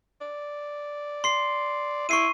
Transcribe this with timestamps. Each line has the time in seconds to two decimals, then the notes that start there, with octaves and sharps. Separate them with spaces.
0.21 D5
1.24 C6 C7
2.09 E4 C#6 C7 D#7